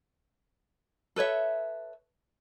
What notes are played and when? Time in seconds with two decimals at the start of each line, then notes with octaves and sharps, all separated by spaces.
1.16 A4 B4 C#5 E5